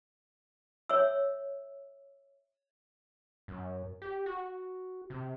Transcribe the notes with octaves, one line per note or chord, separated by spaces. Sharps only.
C#5 E5 E6
F#2
G4
F#4
C3